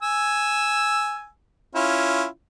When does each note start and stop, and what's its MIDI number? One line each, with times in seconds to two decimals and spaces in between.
0.03 1.28 80
0.03 1.28 88
1.75 2.26 61
1.75 2.26 64
1.75 2.26 65